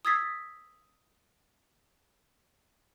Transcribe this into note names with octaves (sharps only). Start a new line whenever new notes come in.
D#6 E6 G#6 A6 B6 C7